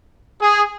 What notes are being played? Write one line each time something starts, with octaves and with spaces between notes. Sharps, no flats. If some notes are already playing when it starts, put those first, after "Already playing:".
G#4